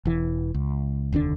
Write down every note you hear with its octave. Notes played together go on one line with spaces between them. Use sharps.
E1 E3
C#2
F1 D#2 D3 D4